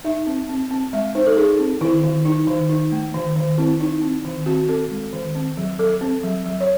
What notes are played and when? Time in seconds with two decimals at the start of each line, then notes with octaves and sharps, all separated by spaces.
0.04 D#4 E5
0.27 C4
0.49 C4
0.71 C4
0.93 G#3 E5
1.15 D#4 C5
1.26 A4
1.37 D#4 G#4
1.59 C4
1.81 D#3 E4
2.03 D#3
2.25 D#4
2.47 D#3
2.70 D#4
2.92 A3
3.14 D#3
3.36 D#3
3.58 C4 E4
3.80 D#4
4.02 C4
4.25 D#3
4.46 C4 F#4
4.69 C4 A4
4.91 G#3
5.13 D#3
5.35 C4
5.57 F#3
5.79 F#3 A4
6.01 C4
6.23 F#3
6.46 F#3
6.60 C#5